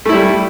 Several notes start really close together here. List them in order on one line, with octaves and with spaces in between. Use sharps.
A3 E4 G3